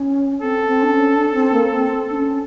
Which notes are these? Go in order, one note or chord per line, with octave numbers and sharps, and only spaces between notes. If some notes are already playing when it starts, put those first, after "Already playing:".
Already playing: C#4
C4 A4
C4
D4
C#4
D4
C4
A#3
C4
D4
C#4